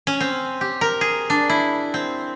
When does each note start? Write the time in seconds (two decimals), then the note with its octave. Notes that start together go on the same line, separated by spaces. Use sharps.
0.07 C#4
0.20 C4
0.61 G4
0.81 A#4
1.01 G#4
1.30 D4
1.49 E4
1.94 C4